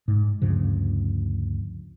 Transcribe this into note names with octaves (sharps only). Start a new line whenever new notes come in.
G#2
D2 G2 C#3 F3